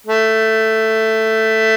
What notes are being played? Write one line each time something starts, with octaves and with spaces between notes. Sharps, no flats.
A3